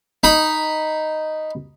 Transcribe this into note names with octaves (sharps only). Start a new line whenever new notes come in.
D#4 B5